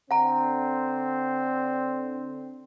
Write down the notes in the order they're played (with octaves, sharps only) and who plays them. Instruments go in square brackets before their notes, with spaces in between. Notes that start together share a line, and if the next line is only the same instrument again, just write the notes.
[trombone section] D3 C4 [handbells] F#5 A#5